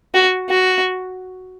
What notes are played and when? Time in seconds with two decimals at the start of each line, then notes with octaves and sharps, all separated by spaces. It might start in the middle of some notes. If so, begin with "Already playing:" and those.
0.15 F#4
0.50 F#4